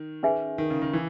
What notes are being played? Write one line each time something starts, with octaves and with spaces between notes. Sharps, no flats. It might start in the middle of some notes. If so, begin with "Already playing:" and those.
Already playing: D#3
C#4 G#4 B4 E5 G#5
D#3
C#3
D#3
E3